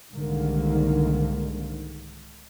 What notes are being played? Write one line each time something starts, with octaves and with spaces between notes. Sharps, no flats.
C2 G#2 D3 D#3 A#3